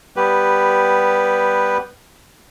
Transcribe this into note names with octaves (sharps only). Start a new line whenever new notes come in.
G3 B3 G4 B4